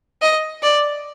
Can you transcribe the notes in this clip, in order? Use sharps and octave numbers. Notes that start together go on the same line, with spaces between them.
D#5
D5